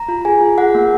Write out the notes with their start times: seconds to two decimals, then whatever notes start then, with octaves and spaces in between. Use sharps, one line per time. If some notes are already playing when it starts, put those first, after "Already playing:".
Already playing: A#5
0.08 F4
0.25 G#4 G#5
0.41 F4
0.58 G#4 F#5
0.75 A#3